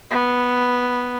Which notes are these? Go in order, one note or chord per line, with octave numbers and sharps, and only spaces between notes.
B3